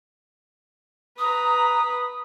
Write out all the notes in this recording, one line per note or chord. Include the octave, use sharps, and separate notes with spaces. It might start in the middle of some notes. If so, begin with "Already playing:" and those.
B4 A#5 D#6